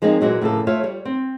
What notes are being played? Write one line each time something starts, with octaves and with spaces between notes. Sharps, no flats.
F3 G#3 A#3 C4 D4 D#4
A#2 E3 F#3 G#3 F#4
A2 C#3 F3 A3 A#3 A4
A3 F4 C#5 E5 F5
G3 C#5
C4